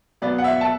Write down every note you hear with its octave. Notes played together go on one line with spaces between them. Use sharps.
B2 F#3 B3 D5
F#5
E5
A5